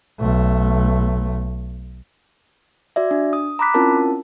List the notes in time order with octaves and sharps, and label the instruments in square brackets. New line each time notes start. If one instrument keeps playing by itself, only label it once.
[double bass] B1 A3
[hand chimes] F#4 D5 E5
D4
D#6
A#5 B5 D6 F#6 B6
C4 C#4 E4 F4 A#4 A5